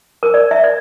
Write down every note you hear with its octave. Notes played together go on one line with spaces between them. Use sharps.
A#4
D5
E5
D5